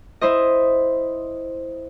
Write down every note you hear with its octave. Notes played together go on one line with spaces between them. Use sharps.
E4 C5 D#5